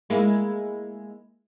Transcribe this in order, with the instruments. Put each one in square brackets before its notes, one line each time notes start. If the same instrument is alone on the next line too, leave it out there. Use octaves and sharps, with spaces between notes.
[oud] G#3 A#3 E4